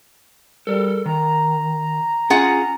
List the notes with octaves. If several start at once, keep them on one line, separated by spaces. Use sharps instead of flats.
G3 A4 A#4
D#3 A#5
C#4 F4 G#4 F#5